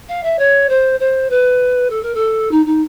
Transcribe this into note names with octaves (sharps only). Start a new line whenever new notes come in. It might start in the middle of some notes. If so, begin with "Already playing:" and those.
F5
E5
C#5
C5
C5
B4
A4
A#4
A4
D#4
D#4